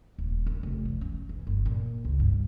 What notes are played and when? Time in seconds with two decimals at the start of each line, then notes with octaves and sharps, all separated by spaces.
0.18 D#1
0.46 F#2
0.63 F1
0.85 E3
1.01 C#4
1.29 E3
1.47 G1
1.66 A#2
2.05 C#2
2.20 G2